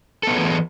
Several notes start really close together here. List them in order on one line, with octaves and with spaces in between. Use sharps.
A4 B3 F#3 G#4 E3